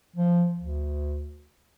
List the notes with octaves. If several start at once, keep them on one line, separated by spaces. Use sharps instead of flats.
F3
D2